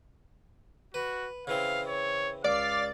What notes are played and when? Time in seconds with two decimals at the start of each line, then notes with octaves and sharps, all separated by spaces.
0.94 F#4 B4
1.47 C#3 E3 C4 F5
1.88 C#5
2.44 C#2 D5 F5